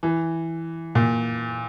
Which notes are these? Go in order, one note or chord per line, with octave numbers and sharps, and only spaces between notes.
E3
A#2